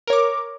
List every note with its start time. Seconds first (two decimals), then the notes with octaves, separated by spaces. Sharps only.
0.07 A#4
0.10 C#5
0.13 D6